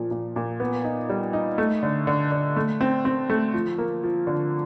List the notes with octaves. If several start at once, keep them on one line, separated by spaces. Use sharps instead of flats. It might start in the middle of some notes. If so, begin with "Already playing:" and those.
Already playing: A#2 F3
A#2
A#2
B3
D#4
G3
D#4
A3
D3
D3
D3
A3
C4
C4
A3
F3
A#3
F3
D3